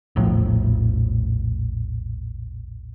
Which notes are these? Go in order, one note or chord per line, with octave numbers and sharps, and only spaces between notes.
E1 A#1 A2 F3